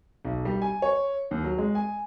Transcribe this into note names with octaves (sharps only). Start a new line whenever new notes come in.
B1
G3
G#5
C#5
D#2
F#3
G#3
G#5